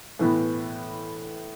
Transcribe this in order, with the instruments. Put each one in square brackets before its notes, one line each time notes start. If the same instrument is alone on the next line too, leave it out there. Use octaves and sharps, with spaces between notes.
[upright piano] A2 E3 B3